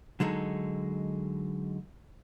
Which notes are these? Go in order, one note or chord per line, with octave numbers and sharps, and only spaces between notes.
D3 F#3 G#3 D#4 A4